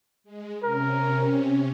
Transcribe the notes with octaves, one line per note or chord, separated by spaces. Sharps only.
G#3
C3 C#4 A#4